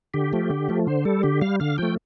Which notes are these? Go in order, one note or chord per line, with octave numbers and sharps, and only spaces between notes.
D3 G4
F3 A3
D3
F3 A3
D3 C5
G3 A4
D3 G4
G3 F5
D3 F5
F3 A3 G5